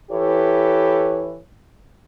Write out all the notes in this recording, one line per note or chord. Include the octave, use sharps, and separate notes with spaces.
E3 E4 G4 A4 B4 C#5